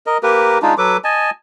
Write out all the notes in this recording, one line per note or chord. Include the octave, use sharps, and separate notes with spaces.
A#4 D#5
A#3 G4 A#4 B4
G#3 D4 D#4 F4
F#3 A4 B4 D6
D#5 G#5 A5